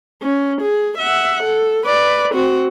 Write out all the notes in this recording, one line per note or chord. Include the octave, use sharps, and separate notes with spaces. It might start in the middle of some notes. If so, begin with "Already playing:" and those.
C#4
G#4
E5 F#5
A4
B4 D5
C4 F#4